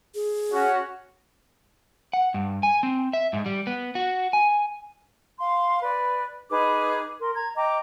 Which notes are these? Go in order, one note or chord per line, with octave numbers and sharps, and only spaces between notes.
G#4
C#4 F#4
F#5
G2
G#5
C4
E5
G#2
G3
B3
F#4
G#5
F5 C6
B4 D5
D#4 G#4 B4 D6
A#4 C6
A#5 G#6
D#5 G5 A#5 D6